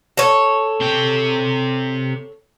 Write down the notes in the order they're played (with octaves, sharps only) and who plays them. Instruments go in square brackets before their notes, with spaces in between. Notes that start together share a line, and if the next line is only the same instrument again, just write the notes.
[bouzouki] A4 C#5
[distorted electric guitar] C3 G5